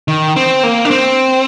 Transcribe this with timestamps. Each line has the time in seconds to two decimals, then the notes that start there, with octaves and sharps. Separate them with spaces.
0.08 D#3
0.36 C4
0.63 A#3
0.85 D4
0.91 C4